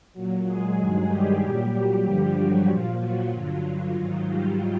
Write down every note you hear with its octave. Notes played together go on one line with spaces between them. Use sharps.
A#2 F#3
G#3 G#4
G2 D#3 F#3
G3 G4
A#2 F#3
G3 G4
G2 D3 F3 G3 G4
F#3 F#4
A#2 F3 F4
F#3 F#4
G2 D3 F#3 F4
F4
G#2 D#3 F#3
G3 G4